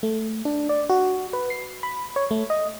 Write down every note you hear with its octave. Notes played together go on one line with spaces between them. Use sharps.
A3
D4
D5
F#4
B4
C7
B5
C#5
A3
D#5